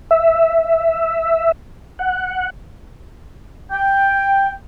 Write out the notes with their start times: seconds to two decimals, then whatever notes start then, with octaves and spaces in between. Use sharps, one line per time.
0.11 E5
1.99 F#5
3.71 G5